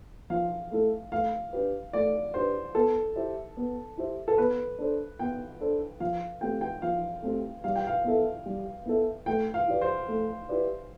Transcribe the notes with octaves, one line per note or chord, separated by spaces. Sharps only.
F3 F5
A3 E4 A4
A3 F5
D4 G4 B4
A3 D5
D4 G4 B4 C5
B3 A4
E4 G4 C5 E5
B3
E4 G4 C5 E5
A4
B3 B4
D4 A4 C5
B3 G5
D4 A4 C5
F3 F5
A3 C4 G4 G5
G5
F3 F5
A3 C4 G4
G3 F5
G5
F5
B3 E4 A4 E5
G3
B3 E4 A4 E5
A3 G5
F5
E4 G4 B4 D5
C5
A3
E4 G4 B4 D5